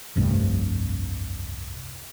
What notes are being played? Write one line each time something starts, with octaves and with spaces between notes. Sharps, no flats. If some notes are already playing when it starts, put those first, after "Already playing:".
F1 C2 G2 A3